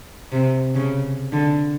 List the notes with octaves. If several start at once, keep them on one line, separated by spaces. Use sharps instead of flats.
C3
C#3
D3